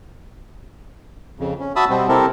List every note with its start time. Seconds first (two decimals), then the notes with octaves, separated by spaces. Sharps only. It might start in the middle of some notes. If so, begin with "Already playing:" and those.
1.40 F2 C#3
1.60 C#4
1.76 F#4 E5 A5 B5 D#6 E6
1.90 B2 G3 B3 C4
2.08 C3 C4 E4 G4 A4 A#4